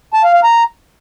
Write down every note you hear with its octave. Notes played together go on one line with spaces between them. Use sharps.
A5
F5
F5
A#5